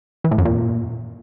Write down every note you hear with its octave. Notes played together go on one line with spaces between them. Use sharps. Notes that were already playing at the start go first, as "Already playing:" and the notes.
E3
A2
F#2
A#2